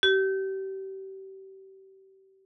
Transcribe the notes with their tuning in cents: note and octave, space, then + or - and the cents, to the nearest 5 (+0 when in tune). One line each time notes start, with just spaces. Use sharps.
G4 -30